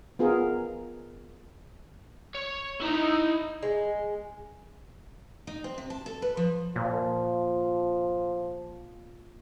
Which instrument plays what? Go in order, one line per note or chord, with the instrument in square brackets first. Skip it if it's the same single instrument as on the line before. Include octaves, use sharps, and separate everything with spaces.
[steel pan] B3 F4 G#4 A#4
[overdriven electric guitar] C#5
[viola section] D#4 [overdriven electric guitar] E4 A#5
[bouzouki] G#3
[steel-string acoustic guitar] D#4
C4
C3
A5
A4
B4
F3
[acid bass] A#2 [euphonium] F3